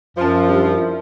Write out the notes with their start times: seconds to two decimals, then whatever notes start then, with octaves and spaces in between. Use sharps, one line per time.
0.17 F#2 F3 C5 A5
0.46 G3 D4
0.65 E4